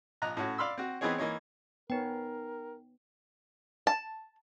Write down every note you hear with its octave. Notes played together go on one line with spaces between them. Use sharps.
A#1 D#5 A#5 F#6
A2 C#4 F#4
D5 F5 B5 C6 E6
C4 F#4
E3 B3 C4 D#4 G#4 C#5
E3 A#3 D#4 C#5
B3 D#4 A#4 C#5 G5
A5